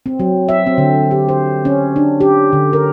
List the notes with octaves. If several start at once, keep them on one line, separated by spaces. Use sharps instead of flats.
C4
F#3
E5
C4
D3
G4
C5
C#4
D4
G4
D3
A#4